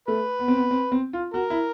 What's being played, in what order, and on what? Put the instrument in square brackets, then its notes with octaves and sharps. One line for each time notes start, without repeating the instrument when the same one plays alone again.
[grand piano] A3 [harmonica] B4
[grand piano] B3
C4
B3
C4
C4
F4
[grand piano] F#4 [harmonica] A#4
[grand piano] E4